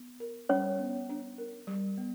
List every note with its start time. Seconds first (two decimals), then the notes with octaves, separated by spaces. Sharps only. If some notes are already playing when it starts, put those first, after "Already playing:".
Already playing: B3
0.20 A#4
0.49 G3 C#4 C#5
0.79 B3
1.09 D4
1.38 A#4
1.67 G3
1.98 B3